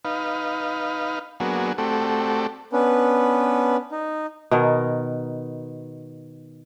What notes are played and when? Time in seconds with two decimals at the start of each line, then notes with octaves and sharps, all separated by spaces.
0.05 D#4 B4 F5
1.40 F#3 A#3 B3 D4 F#4 G#4
1.78 A3 C4 F#4 G4 A4 D5
2.73 B3 C#4 D4 B4
3.92 D#4
4.51 B2 D#3 A#4